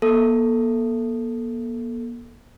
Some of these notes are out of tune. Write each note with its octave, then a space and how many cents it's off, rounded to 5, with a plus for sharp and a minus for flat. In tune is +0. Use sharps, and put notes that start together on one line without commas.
A#3 +45 A4 +0